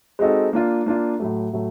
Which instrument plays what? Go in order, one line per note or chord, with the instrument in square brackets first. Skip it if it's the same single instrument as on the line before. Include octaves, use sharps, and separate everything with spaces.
[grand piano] G#3 C4 D#4 F#4 A4
A#3 D4 F4
A#3 D4 F4
A2 F#3 A3
A2 F#3 A3